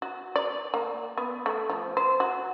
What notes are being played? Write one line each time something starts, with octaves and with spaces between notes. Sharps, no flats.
F#4
D5
A#3
B3
A3
F3
C5
F#4